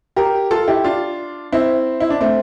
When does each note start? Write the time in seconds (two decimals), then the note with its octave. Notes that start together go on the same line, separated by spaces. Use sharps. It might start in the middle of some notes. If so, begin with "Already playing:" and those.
0.16 G4 A#4
0.51 F4 A4
0.68 E4 G4
0.84 D4 F4
1.52 C4 E4
2.00 E4
2.10 D4
2.20 A3 C4